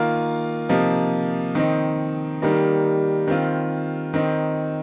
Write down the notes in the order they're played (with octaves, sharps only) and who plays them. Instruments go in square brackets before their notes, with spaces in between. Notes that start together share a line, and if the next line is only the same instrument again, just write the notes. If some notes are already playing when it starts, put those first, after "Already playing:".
Already playing: [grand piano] D#3 A#3 F4
C3 F3 A#3 D#4
D#3 C4 D#4
D#3 G3 A#3 D#4
D#3 C4 F4
D#3 C4 D#4